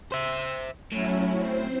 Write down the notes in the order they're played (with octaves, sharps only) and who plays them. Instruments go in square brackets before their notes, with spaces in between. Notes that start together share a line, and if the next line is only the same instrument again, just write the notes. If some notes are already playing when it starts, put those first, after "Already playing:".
[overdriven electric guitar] C5 E5
[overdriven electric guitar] A2 [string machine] F#3 C#4 E4
[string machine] C4 C5